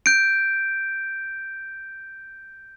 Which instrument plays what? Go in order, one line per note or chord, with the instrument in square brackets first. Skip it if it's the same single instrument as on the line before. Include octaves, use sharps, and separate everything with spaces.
[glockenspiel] G6 D7